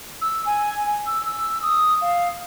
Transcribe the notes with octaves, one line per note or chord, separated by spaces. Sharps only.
E6
G#5
E6
E6
D#6
F5